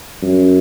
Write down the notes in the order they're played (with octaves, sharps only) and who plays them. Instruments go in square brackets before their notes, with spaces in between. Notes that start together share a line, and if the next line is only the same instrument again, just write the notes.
[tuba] F#2